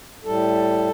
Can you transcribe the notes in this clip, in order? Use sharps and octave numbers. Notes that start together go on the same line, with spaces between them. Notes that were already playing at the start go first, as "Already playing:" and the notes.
A2 G3 A4